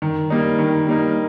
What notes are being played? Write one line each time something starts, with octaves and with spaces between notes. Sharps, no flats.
D#3
G3 A#3 D#4
D#3
G3 A#3 D#4